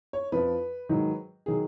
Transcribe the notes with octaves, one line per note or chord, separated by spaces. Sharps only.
C#5
F2 F3 B4
G#2 D#3 F#3
D#3 F#3 G#4